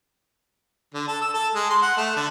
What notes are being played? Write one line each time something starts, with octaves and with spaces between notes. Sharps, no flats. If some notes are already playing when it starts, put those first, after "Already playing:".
D3
A4
E6
A4
G#3
C6
F#5
A3
D3